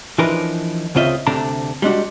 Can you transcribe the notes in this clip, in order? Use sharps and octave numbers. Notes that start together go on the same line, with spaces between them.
E3 F3 D4 D#4 A#4 B4
C#2 C#3 C4 F4 D#5 E5
D2 C3 A3 D4 A#5
G3 G#3 D4 F#4